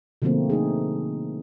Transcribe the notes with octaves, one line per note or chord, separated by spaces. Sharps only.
B2 D3 F3 A3 A#3 C4
A3 D#4 G#4